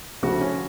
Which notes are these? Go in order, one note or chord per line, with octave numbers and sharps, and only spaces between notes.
D2 C#3 F3 F#4
C#4